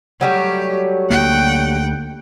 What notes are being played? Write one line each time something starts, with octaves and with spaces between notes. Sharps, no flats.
F#3 G3 A3 G4
D2 A#3 F#5 G5